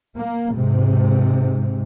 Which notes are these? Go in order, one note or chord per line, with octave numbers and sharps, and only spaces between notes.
A#3
G#2 C3